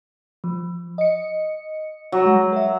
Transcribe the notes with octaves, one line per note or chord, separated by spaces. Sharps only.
F3
D#5 C#7
F#3
G#3
A#4 E5